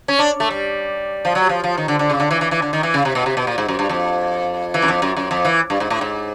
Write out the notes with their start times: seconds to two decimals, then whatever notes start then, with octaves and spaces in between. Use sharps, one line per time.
0.08 C#4
0.19 D4
0.40 A3
0.50 G3
1.25 F3
1.35 F#3
1.49 F3
1.64 F3
1.78 D#3
1.88 D3
1.99 D3
2.10 C#3
2.20 D3
2.31 E3
2.41 E3
2.51 E3
2.62 D3
2.73 D#3
2.83 E3
2.94 C#3
3.05 C3
3.15 B2
3.26 C3
3.37 B2
3.47 A#2
3.58 G#2
3.68 F#2
3.79 G2
3.89 F2
4.74 E3
4.82 F#2
4.88 F2
5.02 F#2
5.17 F#2
5.31 F2
5.45 E3
5.70 G2
5.80 G#2
5.90 A2
6.01 G#2